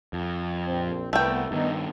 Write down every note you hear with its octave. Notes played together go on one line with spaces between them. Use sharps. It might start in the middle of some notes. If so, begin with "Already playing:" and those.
F2
A#1 C4
C2 A3 B3 G5
G2 D#3 B3 D#4